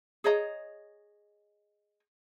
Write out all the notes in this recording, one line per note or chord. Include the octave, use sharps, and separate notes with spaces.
G#4 C#5 D#5 A#5